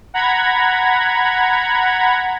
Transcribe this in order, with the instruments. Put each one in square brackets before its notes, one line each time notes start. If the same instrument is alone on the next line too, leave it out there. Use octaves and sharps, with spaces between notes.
[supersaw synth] F#5 A#5 B5 G#6